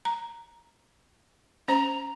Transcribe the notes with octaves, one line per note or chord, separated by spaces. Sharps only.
A#5
C#4 C5 A#5